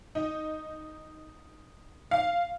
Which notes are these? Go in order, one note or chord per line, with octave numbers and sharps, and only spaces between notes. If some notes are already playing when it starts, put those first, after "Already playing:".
D#4
F5